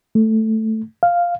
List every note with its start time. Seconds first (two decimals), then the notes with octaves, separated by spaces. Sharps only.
0.15 A3
1.03 F5